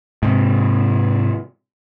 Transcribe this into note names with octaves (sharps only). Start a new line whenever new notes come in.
G#2 C3